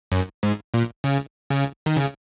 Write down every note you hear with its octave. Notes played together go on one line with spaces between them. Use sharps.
F#2
G#2
A#2
C#3
C#3
D#3
C#3